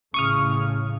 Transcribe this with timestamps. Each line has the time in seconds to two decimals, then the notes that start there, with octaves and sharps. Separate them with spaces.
0.14 A1 A2 C#3 C#6 D#6 F6